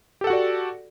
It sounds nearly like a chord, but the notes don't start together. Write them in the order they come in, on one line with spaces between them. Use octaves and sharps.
G4 A4 F#5 F#4 D5